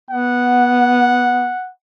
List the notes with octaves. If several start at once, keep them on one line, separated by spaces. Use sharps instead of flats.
B3 F#5